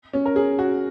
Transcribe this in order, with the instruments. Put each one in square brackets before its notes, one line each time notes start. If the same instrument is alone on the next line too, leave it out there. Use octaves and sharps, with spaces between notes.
[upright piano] C#4
A#4
G#4
F#4